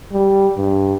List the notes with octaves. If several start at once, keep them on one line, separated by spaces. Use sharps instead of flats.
G3
G2